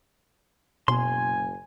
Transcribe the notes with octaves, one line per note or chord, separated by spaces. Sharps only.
F#1 B2 G#5 C6